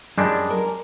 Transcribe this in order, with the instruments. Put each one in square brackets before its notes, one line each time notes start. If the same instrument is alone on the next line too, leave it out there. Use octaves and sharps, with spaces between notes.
[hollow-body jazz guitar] F#2 [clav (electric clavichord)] G3 G#3 D4
[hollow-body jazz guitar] A#4